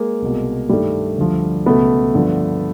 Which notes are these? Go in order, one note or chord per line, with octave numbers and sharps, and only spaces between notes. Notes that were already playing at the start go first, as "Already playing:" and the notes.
Already playing: G#3 A#3
C2 B2
G2 D#3 G3 A3
D2 D3 F3
C#2 B2 A3 B3
G2 D3 F3